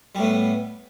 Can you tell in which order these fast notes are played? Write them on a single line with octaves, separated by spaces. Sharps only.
G3 A2 B3